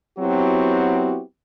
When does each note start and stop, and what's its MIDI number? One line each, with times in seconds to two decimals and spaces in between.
0.19 1.20 54
0.19 1.20 59
0.19 1.20 60
0.19 1.20 64
0.19 1.20 66
0.19 1.20 67